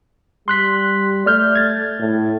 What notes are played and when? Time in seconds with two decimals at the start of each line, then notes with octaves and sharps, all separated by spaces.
0.48 G3 C6 F#6 B6
1.26 A3 D5 F6 G6
1.56 G#6 A6
2.00 A2